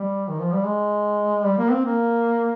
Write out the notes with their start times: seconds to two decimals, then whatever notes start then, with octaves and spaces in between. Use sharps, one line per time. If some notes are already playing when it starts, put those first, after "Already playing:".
Already playing: G3
0.28 D#3
0.40 F3
0.52 G3
0.65 G#3
1.45 G3
1.58 A#3
1.72 C4
1.86 A#3